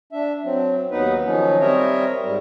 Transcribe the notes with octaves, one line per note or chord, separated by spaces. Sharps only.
D4 E5
F#3 C4
D#2 F#3 B3 D#4 B4
D#3 F3 F#3 C#4 D#4
G3 C4 A#4 C#5 D#5 E5
G#2 G3